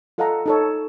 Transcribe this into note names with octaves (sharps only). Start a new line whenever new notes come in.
F4 A4 D#5 F5 F#5 A#5
D#4 A4 C#5